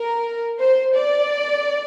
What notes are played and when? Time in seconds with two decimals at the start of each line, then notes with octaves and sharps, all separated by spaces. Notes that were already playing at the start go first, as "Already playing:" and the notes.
Already playing: A#4
0.60 C5
0.96 D5